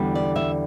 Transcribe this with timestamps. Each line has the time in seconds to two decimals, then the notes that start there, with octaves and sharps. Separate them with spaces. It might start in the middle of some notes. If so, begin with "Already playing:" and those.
Already playing: E2 D3 G3
0.15 D5
0.36 E5